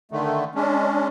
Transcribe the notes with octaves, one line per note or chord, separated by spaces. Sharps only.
D3 D#3 A3
G#3 C#4 D4